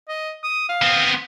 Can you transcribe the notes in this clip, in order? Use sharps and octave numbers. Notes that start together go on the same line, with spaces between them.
D#5
D#6
F5
B3 C4